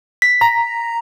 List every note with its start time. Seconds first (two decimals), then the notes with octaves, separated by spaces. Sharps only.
0.22 B6
0.41 A#5